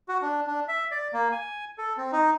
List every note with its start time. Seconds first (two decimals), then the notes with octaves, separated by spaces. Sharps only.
0.09 F#4
0.22 D4
0.47 D4
0.68 E5
0.91 D5
1.13 A#3
1.32 G#5
1.78 A4
1.98 C4
2.12 D#4